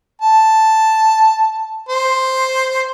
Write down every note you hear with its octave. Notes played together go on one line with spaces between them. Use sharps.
A5
C5